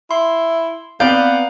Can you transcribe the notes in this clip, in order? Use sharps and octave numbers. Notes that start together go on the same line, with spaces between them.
E4 C6
B3 C4 B4 D5 F5 A#5 G6